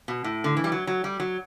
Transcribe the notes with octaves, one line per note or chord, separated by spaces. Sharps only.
B2
A2
D3
E3
G3
F#3
F#3
G3
F#3